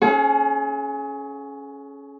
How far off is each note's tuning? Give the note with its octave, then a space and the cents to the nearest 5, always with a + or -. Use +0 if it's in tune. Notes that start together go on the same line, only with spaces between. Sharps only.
C#4 +0 G#4 +40 F#5 -25